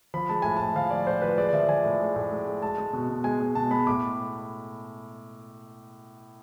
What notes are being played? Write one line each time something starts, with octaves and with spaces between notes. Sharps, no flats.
F3 B5
G#3 A5
A2 G#5
A2 A5
F3 F5
F3 D5
A2 C5
F3 B4
G#3 D5
D5
F3 E5
F3 G#5
A2
G#3
A2
G#3
G#3
G#3 A5
G#3
B2
B2
G#3 G#5
G#3
B2 A5
G#3 B5
A2 D6